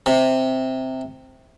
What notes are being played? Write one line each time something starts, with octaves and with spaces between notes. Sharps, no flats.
C3